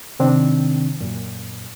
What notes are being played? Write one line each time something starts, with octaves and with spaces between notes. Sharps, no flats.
C3 D#3 C4 D4
F#2 A#2